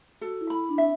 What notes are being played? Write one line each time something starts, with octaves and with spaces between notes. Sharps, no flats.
F#4 A4
E4
B5
E4
D4
C4 E5